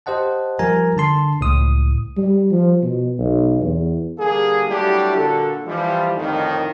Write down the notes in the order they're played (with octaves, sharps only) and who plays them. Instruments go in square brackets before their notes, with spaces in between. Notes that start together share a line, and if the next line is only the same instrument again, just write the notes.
[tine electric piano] G4 C5 D#5 F#5 A5
F3 G3 A#4 G#5 A#5
D3 A5 C6
C#2 A2 D#6
[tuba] G3
F3
B2
B1
E2
[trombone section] D3 G3 A#3 G#4
F#3 G3 A3 D4 E4 G4
A#2 D3 F#4 A4
E3 F3 G3
F2 A2 D3 D#3